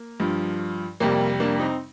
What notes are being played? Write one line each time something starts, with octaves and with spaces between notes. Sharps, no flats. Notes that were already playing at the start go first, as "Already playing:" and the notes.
Already playing: A#3
G2 F3
F2 C3 G3 A#3
A#3 D4
C4 D#4